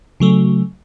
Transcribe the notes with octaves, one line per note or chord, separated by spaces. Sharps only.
C#3 F#3 A3